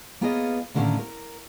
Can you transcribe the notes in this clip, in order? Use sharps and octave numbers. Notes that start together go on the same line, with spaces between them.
A#3 B3 F4 G#4 C#5 D#5
A2 D3 D#3 G#3 A#3 C#4
A#4